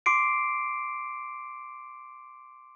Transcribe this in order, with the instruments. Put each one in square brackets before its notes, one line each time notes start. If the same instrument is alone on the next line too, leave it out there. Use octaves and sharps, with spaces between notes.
[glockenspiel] C6 D6 C7 D7